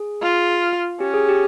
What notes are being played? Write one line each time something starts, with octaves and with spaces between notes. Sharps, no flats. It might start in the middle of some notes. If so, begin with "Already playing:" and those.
Already playing: G#4
F4
C#4 G4
G#4
G4